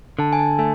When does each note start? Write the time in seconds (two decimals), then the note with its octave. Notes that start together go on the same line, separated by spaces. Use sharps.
0.19 D3 A5
0.33 G#5
0.39 A5
0.59 A3 G#5